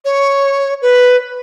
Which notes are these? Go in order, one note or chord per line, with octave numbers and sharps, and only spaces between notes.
C#5
B4